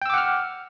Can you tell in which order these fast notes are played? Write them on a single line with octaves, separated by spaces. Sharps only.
G5 E6 D6 F#5 F6